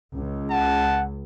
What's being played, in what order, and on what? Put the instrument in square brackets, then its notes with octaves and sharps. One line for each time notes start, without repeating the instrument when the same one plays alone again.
[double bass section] C#2
[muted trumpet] F#5 [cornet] A5